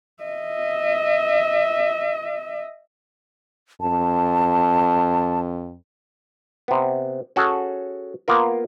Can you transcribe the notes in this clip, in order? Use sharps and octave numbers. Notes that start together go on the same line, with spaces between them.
D#5 E5
F2 A5
C3 B3
C#4 F#4 G#4 A4
A#3 B3 F4 A#4